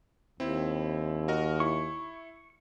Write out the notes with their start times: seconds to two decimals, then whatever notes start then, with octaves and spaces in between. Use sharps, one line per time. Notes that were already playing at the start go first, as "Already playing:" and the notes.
0.40 D#2 C4 E4
1.28 F#4 A#4 D#5
1.60 E4 C#6